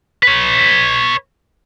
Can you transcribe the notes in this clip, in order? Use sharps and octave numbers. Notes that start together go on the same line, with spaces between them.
B4 C#5